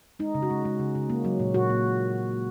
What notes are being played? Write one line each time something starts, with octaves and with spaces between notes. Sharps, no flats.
G#3 D#4
C#3
F#4
G#3
G#3
C#3
C#3
A#3
F#3
A#2
A#2 F#4
A#2